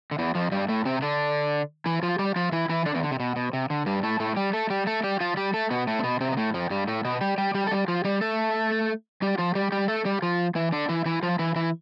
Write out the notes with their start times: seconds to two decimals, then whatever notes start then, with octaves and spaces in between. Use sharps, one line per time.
0.11 D3
0.19 E2 E3
0.35 F2 F3
0.52 G2 G3
0.69 A2 A3
0.85 C3 C4
1.02 D3 D4
1.86 E3 E4
2.03 F3 F4
2.19 G3 G4
2.36 F3 F4
2.52 E3 E4
2.69 E3 E4
2.86 D3 D4
2.94 E2 E3
3.03 D3
3.11 C3
3.20 B2
3.36 B2
3.53 C3
3.70 D3
3.86 G2 G3
4.03 A2 A3
4.20 A2 A3
4.37 G3 G4
4.53 A3 A4
4.70 G3 G4
4.87 A3 A4
5.04 G3 G4
5.20 F3 F4
5.37 G3 G4
5.54 A3 A4
5.71 B2 B3
5.87 A2 A3
5.99 C4
6.04 B2 B3
6.21 C3 C4
6.32 B3
6.37 A2 A3
6.54 F2 F3
6.70 G2 G3
6.88 A2 A3
7.05 B2 B3
7.21 G3 G4
7.38 G3 G4
7.54 G3 G4
7.67 A4
7.71 G3 G4
7.88 F3 F4
8.04 G3 G4
8.21 A3 A4
9.22 G3 G4
9.38 F3 F4
9.55 G3 G4
9.72 G3 G4
9.88 A3 A4
10.05 G3 G4
10.22 F3 F4
10.55 E3 E4
10.73 D3 D4
10.89 E3 E4
11.05 E3 E4
11.23 F3 F4
11.39 E3 E4
11.56 E3 E4